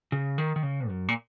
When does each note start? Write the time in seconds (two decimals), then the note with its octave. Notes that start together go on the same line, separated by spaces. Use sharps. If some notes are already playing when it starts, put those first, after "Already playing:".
0.12 C#3
0.38 D#3
0.56 D#3
0.63 C#3
0.88 F#2
1.09 A#2